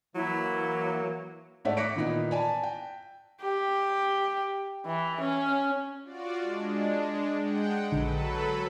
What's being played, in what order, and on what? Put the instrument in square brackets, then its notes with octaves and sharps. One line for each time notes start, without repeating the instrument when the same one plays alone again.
[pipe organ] E3 A#3 [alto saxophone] F#3 [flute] E4
[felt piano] G#2 A3 C#5 D5 E5 F#5
D6 F#6 A#6 B6 C#7 D7
A#2 D#3 E3 B3 D#4 E4
D5 G#5 A5
G5
[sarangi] G4
E3
C#4
[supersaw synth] F4 F#4 D5
G#3 D4
G#3 F#5 G5
[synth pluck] A#1 D3 [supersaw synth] F#3 A4 B4